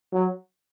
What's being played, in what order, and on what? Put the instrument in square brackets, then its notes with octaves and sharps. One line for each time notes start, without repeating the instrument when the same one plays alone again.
[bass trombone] F#3